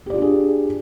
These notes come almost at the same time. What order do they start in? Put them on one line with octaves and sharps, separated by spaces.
G4 D5 F4 D4 G#4